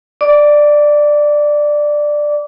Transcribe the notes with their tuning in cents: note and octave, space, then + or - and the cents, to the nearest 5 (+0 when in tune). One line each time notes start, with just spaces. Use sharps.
D5 +10 D6 -20